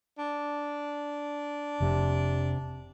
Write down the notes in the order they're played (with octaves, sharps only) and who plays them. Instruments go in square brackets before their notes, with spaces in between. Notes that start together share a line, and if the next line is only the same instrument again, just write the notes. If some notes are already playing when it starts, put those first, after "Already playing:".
[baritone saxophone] D4
[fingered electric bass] F1 [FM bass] C3